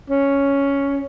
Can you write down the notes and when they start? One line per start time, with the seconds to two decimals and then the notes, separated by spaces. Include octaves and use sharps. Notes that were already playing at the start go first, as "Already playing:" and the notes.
0.10 C#4